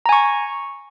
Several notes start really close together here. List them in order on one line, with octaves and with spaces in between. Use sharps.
A#5 G#5 C#6